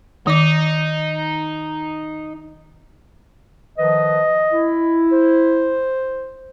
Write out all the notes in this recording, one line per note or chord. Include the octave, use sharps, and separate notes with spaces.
D#3 D#4 D6
D#3 F3 B4 D#5
E4
C5